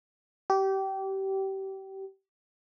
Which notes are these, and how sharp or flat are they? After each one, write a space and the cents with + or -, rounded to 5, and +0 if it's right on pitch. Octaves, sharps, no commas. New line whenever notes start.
G4 -25